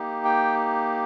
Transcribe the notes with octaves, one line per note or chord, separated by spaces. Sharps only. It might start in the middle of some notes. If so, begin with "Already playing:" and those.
Already playing: A#3 D#4 G4
G5